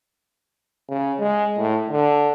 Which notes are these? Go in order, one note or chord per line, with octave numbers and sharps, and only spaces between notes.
C#3
G#3
A2
D3